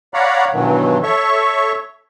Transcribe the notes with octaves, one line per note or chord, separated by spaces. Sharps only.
C#5 D5 F5 F#5 A#5 B5
G2 B2 D#3 E3 F#3
A4 C#5 E5 C#6